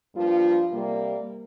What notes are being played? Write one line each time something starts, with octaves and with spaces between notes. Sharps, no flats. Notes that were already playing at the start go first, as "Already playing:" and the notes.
G2 F3 A#3 F4
C3 G3 A#3